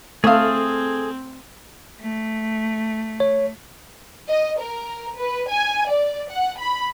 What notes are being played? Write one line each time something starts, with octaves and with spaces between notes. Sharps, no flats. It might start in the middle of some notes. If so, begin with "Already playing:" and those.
A3 C4 G#4 A4 F5 D#6
A3
C#5
D#5
A#4
B4
G#5
D5
F#5
B5